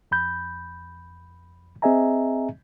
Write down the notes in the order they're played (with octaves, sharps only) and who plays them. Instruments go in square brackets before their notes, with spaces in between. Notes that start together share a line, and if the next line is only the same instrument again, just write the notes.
[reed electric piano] F2 B5 G6
C4 G#4 D#5 E5 G#5 A#5